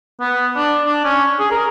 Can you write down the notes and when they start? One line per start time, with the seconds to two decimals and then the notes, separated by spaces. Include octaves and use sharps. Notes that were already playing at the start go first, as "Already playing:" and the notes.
0.20 B3
0.56 D4
0.85 D4
1.05 C#4
1.39 G#4
1.51 A#4